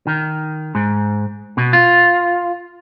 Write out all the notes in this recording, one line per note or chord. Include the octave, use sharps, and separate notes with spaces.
D#3
G#2
B2
F4